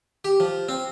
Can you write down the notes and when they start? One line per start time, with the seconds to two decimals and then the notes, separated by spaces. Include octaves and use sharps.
0.25 G4
0.40 F3
0.69 C4